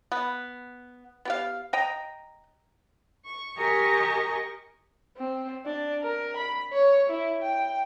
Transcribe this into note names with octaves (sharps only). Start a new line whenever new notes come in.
B3
B3 G4 F5
D#5 G5 A#5
C#6
G4 A#4 D#5 G#5 C#6
C4
D4
A#4
B5
C#5
E4
G5